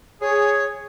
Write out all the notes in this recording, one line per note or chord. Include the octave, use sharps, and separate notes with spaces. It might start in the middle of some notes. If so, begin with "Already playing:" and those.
G#4 C#5